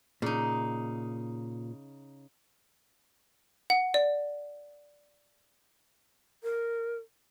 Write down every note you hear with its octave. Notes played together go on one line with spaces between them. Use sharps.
A#2 C#3 D#4
F#5
D5
A#4